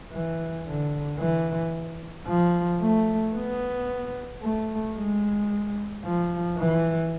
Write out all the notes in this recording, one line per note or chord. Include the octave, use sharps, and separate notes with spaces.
E3
D3
E3
F3
A3
B3
A3
G#3
F3
E3